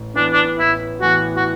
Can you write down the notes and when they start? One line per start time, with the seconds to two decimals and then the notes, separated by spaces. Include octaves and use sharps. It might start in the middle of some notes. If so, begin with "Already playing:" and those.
Already playing: A1
0.15 A2 E3 B3 D4
0.33 D4
0.59 A1 E4
1.01 A2 E3 B3 F#4
1.36 F#4